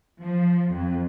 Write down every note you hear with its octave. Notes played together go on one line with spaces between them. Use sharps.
F3
F2